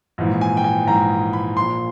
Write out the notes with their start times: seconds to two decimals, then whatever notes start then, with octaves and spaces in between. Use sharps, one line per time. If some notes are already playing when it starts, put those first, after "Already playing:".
0.18 A#1 G#2 E3
0.41 G#5
0.57 G5
0.64 G#5
0.87 A#1 G#2 E3 A#5
1.33 B5
1.57 A#1 A#2 C6